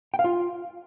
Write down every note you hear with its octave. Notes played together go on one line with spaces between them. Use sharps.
G5
F5
F4